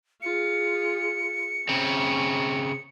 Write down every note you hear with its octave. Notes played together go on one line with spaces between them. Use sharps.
F4 G#4 C#7
C#3 C4 C#4